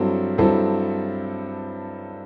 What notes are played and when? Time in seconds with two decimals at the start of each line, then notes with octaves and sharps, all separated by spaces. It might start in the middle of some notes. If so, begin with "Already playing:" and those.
Already playing: G2 F#3 C4 E4 A4
0.38 G2 F#3 C4 E4 A4